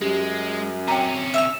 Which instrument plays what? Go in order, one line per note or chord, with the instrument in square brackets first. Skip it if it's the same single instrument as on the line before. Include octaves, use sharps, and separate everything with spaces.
[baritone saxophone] F#2 [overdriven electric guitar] G#3 [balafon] G4
[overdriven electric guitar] C3 C#4 [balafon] G5 A#5
[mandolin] E5 E6 F6